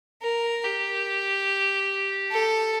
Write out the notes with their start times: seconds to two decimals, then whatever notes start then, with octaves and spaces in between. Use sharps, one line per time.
0.22 A#4
0.64 G4
2.31 A4